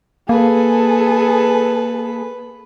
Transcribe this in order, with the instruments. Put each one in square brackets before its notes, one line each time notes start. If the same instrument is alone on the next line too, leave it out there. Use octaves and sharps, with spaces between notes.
[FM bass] A#3 [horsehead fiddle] G#4 A4 [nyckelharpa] B4